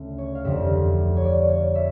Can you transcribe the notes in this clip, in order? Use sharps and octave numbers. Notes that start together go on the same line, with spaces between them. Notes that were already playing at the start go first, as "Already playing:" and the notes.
Already playing: D2 C#3 E5
C#5
F5
F1 F2 D3 F3 E5
C#5
D5
C#5
E5